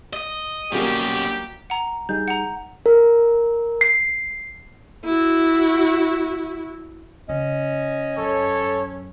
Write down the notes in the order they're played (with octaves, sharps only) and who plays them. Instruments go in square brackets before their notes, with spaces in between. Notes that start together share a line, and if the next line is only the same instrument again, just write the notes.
[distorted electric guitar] D#5
[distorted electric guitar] B2 C#4 [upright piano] F#3 G3 A#3 [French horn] G4
[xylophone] F#5 A#5
[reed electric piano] G3 D#4 G#4 [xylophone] G6
[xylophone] F#5 A#5
[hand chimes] A#4
C7
[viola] E4 F#4
[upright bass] C#3 [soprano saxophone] C#4 [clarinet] D#5
[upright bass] F#2 [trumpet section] A4 C#5